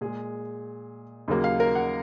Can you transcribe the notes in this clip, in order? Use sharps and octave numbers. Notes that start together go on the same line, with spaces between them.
A#2 G#3 G#4
D#2 C#3 F#3 A#3
F5
A#4
F#5